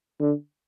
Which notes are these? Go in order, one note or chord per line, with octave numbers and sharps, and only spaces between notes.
D3